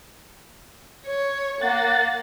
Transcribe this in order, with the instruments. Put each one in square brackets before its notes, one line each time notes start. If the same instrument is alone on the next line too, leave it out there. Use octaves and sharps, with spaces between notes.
[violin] C#5
[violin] A#3 [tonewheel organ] F#5 A6